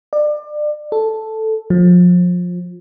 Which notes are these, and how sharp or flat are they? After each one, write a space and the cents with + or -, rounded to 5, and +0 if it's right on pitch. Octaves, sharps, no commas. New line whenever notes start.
D5 +30
A4 +0
F3 +30